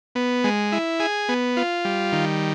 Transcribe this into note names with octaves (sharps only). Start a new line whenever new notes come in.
B3
G#3
E4
G#4
B3
F4
G3
D#3